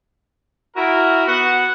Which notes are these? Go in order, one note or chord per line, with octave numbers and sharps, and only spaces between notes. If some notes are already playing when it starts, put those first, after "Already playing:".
E4 F#4 A#4
B3 F#4 F#5